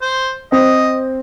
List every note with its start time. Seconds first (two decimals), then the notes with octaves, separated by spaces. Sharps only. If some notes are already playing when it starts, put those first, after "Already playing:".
0.02 C5
0.52 C4 D#5